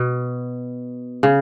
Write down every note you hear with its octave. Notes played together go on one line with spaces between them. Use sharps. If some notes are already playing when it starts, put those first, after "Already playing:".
Already playing: B2
C#3